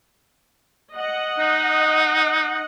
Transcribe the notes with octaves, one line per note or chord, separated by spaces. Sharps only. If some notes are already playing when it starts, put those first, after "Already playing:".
D#5 F#5
D#4